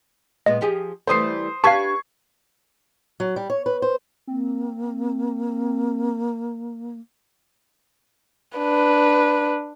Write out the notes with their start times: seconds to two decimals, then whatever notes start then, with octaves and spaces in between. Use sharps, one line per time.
0.46 A#2 G#3 B3 D#5
0.61 F3 G4 G#4
1.07 E3 G3 A3 C5 D#6 C7
1.64 D4 G4 B4 F5 A5 C#6 G#6 C7
3.20 F#3
3.36 G3
3.50 C#5
3.66 B4
3.82 C5
4.27 A#3 C4
8.58 D4 B4